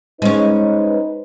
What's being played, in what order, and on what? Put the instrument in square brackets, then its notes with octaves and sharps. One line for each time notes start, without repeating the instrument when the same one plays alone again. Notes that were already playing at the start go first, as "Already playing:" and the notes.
[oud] G#3 C#4 [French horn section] D#4 B4 C5